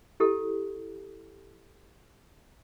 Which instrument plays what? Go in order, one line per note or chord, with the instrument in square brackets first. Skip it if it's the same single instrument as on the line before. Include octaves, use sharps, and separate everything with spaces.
[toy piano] E4 G4 A4